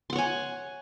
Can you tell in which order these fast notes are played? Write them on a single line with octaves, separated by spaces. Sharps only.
C6 F#5 C#5 G#5